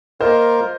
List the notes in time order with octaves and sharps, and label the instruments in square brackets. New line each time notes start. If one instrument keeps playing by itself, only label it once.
[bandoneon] A#3 F4 A#4 [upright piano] C5 D#5